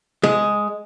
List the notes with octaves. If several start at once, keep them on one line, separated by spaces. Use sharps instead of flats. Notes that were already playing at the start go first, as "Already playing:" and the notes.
G#3